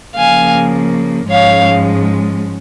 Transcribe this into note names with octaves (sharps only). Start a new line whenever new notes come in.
C#3 F3 A#3 F5 G#5
G#2 F3 G#3 C#4 C#5 F5